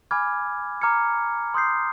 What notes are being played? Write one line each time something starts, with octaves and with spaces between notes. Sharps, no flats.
G#5 B5 D6 F6 G#6
A#5 D6 F6 G#6 C#7
C6 D#6 G6 C7